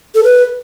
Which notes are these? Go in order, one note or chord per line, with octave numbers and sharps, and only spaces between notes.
A4
B4